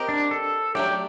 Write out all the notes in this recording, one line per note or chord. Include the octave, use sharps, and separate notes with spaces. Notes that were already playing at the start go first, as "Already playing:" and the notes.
Already playing: C4 G4 A#4 D#5
D4
A4
F#3 A3 D4 G4